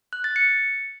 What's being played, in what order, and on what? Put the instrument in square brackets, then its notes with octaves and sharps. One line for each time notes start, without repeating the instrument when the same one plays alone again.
[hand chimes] F#6
A6
C#7